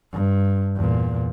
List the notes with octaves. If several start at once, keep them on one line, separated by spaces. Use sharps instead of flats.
G2
E2 A#2